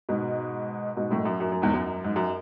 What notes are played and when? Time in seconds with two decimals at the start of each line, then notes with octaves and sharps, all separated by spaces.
0.09 G#2 B2
0.97 G#2 B2
1.11 F#2 A2
1.25 F#2
1.40 F#2
1.52 F#2
1.62 E2 G#2
1.74 F#2
2.04 G#2
2.16 F#2